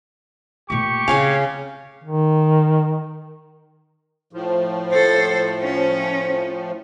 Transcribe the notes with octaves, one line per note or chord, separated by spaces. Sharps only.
A#2 A3 G4 C#6
C#3 C4 C#5 F5 G#5
D#3
A2 F3
A4 C5
C#4